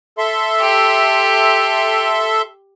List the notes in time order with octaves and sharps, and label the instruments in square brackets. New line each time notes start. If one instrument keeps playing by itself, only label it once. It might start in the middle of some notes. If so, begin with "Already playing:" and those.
[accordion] A4 E5 C6
[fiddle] G4